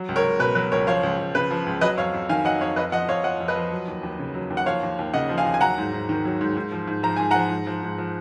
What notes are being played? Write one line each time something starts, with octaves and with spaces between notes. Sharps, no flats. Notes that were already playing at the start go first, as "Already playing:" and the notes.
Already playing: F#3
C#2
A#4 C#5
C#2
B2 B4
F#3 B4
C#2 A#4 C#5
F3 C#5 F5
C#2
C#2
C#3 B4
F3
C#2
F#3 B4 D#5
F2 C#5 F5
F2
D#3 F5 G#5
F#3 D#5 F#5
F2 C#5 F5
F2 B4 D#5
F3 D#5 F#5
F2 C#5 F5
F3 D#5 F#5
F2
B4 D#5
F3
F#3
D#2
D#2
C#3
F#3
D#2
F#5
F3 C#5 F5
D#2
D#2
C#3 D#5 F#5
F3
F5 G#5
D#2
G#5
F#3 F#5 A#5
G#2
G#2
D#3
F#3
G#2
G#2
F3
G#2
F3 A#5
G#2 G#5
F3 F#5 A#5
G#2
F3
G#2
F3